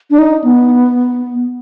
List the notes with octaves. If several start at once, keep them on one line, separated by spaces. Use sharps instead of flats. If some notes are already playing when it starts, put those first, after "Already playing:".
D4
D#4
B3